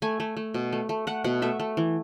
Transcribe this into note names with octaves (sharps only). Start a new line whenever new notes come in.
A3 G#5
A3
A3
B2
A3
A3
A3 F#5
B2 F#5
A3 E5
A3
E3